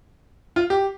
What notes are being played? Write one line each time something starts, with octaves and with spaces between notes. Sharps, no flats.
F4
G4